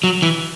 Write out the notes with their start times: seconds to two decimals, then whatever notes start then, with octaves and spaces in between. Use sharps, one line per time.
0.04 F#3
0.22 E3